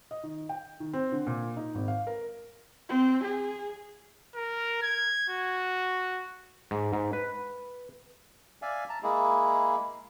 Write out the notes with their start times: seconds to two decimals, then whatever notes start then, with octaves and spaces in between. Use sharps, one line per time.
0.11 D#5
0.23 D#3
0.49 G5
0.80 D#3
0.93 C4
1.12 D3
1.27 A#2
1.57 D#4
1.75 G#1
1.88 F5
2.07 A#4
2.89 C4
3.24 G#4
4.35 A#4
4.82 G#6
5.29 F#4
6.71 G#2
6.93 G#2
7.13 B4
8.62 D5 E5 F5 G#5
8.89 A5 A#5
9.03 G#3 A#3 E4 G#4